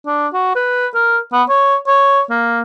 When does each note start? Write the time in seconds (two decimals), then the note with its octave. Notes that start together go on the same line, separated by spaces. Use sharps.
0.06 D4
0.33 F#4
0.55 B4
0.94 A#4
1.33 B3
1.49 C#5
1.87 C#5
2.30 A#3